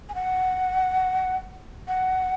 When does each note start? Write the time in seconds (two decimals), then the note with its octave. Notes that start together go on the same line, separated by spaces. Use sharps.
0.09 G#5
0.15 F#5
1.88 F#5